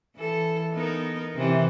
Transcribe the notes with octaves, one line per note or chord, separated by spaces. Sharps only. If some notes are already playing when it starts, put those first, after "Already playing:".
E3 A4
B3 D#4 A#4
C3 E3